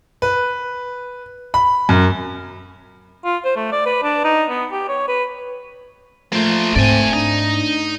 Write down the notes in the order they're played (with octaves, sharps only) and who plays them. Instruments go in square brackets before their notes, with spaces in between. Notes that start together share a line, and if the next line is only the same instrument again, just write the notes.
[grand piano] B4
B5
F#2
[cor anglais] F4
C5
A3
D5
B4
D4
D#4
B3
G4
C#5
B4
[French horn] F3 [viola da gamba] A3 [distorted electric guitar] A#3 C5
[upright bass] G#2 [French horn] C4 [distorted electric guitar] D5 G#5
[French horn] D4 [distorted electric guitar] D#4